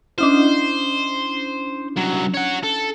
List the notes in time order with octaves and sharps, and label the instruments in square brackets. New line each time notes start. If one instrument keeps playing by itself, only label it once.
[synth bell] C#4 D4 E4 [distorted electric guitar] C5
[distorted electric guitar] C2 F#3
C#5 F#5
A4